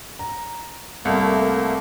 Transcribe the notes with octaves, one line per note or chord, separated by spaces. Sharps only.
A#5
C2 A3 A#3